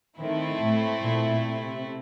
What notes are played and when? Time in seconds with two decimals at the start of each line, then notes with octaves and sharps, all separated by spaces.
0.18 D#3 A3 C4 E4
0.60 A2
1.01 A#2
1.43 C3